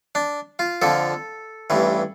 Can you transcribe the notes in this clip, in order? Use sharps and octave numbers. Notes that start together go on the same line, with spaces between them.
D4
F4
F2 D3 F3 A4
A1 G2 E3